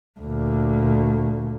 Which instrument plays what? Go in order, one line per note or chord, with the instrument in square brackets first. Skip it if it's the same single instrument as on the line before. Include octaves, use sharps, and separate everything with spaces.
[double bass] D2 A#2